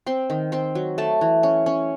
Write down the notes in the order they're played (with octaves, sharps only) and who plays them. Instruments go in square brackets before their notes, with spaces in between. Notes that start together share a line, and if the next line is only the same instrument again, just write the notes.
[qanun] C4 C6
D#3
C4 C6
F#3
A3 A5
E3
C#4
C#4